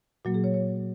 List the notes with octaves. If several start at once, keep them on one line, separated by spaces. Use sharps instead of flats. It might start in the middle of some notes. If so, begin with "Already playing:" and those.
A#2 F#3 A#3 F#4
G#4
C#5
C#5